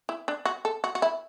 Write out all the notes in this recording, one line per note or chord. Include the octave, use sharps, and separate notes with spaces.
E4
D4
F#4
A4
F#4
F#4
E4